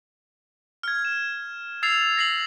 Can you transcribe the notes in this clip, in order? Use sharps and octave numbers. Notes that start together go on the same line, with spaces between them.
F6 G#6
E7
E6 G#6 A6 C7 F7
A#6 C7 F#7